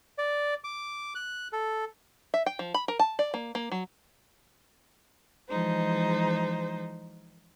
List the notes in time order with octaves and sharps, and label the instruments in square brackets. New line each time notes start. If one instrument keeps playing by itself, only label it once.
[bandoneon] D5
D6
F#6
A4
[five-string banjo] E5
G5
F3
B5
A#4
A5
D5
A#3
A#3
F#3
[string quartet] E3 F3 G#3 D#4 C5